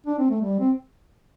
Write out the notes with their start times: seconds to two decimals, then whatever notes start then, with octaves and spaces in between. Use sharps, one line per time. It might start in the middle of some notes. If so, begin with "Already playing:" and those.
0.06 D4
0.19 C4
0.30 A3
0.41 G3
0.60 C4